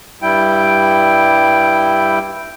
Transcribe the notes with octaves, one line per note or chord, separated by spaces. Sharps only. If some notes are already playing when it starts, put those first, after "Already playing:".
G2 G3 E4 G5